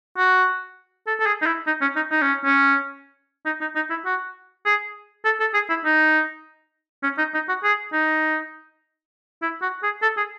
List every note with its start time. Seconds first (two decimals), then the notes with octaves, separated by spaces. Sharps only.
0.18 F#4
1.07 A4
1.20 A4
1.26 G#4
1.42 D#4
1.46 E4
1.67 D#4
1.81 C#4
1.96 D#4
2.11 D#4
2.22 C#4
2.44 C#4
3.46 D#4
3.61 D#4
3.75 D#4
3.90 E4
4.06 F#4
4.66 G#4
5.25 A4
5.40 A4
5.54 G#4
5.69 E4
5.85 D#4
7.03 C#4
7.18 D#4
7.34 D#4
7.49 F#4
7.63 G#4
7.93 D#4
9.42 E4
9.62 F#4
9.83 G#4
10.02 A4
10.17 G#4